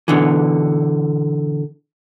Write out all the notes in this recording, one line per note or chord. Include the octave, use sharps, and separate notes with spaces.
B2 D3 E3